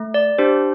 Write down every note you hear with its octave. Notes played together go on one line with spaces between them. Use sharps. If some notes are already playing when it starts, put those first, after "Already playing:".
Already playing: A3
D5
D4 G4 C5